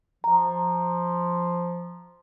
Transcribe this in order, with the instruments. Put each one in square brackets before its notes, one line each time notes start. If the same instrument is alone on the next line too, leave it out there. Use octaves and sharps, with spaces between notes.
[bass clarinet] F3 [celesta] A#5